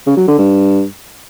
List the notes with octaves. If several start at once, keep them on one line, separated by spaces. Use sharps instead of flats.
C#3
F#3
D3
G2